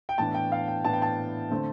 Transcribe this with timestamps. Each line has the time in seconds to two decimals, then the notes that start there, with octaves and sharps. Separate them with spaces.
0.09 G5
0.18 A2 E3 B3 D4 A5
0.34 G5
0.52 F5
0.68 G5
0.84 A2 E3 B3 D4 A5
0.93 G5
1.02 A5
1.50 D3 A3 C4